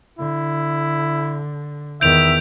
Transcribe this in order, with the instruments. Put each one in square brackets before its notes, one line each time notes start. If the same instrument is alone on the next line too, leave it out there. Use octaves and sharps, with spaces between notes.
[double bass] D3 [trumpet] E4
[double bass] E2 D#3 [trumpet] E5 [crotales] G6 D7 F7